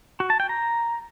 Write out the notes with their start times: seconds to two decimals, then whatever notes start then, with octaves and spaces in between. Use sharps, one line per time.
0.20 F#4
0.30 A5
0.40 G5
0.49 A#5